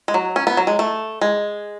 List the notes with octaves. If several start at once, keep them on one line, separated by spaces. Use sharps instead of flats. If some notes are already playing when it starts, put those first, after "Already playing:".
G#3
F#3
C#4
B3
F#3
G#3
A3
G#3